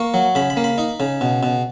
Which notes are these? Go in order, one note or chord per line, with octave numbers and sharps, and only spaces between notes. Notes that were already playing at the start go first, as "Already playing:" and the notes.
Already playing: A#3 C#6
F#3
C#3 B5
B5
A#3
B5
D#4
C#3
B2
B2